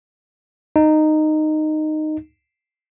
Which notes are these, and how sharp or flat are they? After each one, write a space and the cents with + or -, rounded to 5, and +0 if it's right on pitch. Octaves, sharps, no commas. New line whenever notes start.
D#4 -15